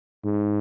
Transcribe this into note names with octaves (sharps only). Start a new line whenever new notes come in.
G#2